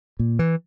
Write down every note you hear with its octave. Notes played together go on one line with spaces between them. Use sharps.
A#2
E3